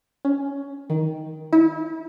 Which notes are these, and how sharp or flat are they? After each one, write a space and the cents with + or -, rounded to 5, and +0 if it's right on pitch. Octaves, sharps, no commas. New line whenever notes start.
C#4 +15
D#3 +15
E4 -30